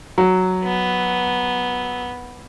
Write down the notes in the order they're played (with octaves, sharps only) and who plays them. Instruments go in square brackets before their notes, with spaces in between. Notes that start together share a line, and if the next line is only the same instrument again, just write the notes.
[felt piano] F#3
[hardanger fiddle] B3